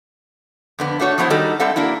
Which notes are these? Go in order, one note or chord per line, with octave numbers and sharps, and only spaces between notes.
F2 D3 B3
A3 D4 F#4 C#5
F3 F#3 B3 D#4 E4 C5
D#3 G3 D#4 F#4 A4
G3 C4 F#4 A4 E5 F#5
A#3 D4 E4 F#4